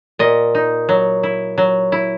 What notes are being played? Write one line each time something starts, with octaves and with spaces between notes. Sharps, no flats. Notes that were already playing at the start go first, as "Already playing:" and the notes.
A#2 D#5
D#4
F#3
E4
F#3
E4